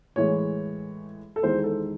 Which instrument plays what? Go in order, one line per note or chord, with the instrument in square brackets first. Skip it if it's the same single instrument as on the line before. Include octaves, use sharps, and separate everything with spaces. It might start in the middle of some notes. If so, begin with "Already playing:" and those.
[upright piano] A2 E3 G#3 C#5
A4
E2 D#3 G#3 C5
A4